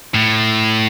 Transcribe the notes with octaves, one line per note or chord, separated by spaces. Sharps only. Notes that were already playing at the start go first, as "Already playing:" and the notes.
A2